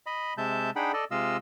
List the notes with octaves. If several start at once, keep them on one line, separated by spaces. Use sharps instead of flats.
D#5 B5
C3 G#3 E5 A5 G6
D4 D#4 G#4 F#5 G5 B5
A4 D5 D#5
C3 G#3 F4 D#5 F5 E6